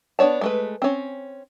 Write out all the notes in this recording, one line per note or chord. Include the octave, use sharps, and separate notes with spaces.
B3 D4 C#5 A5
G#3 A3 B4
C4 C#4